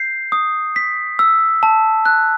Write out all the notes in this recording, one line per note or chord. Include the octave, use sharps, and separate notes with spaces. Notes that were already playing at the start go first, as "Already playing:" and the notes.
Already playing: G6 C7
D#6
B6
E6
A5
F#6